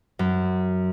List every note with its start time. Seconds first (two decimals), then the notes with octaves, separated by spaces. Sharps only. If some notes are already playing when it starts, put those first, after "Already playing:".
0.19 F#2